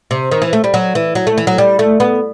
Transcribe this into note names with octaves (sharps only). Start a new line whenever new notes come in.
C3
D#3
E3
A3
G3
F#3
E3
F#3
A3
E3
F#3
G3
A3
B3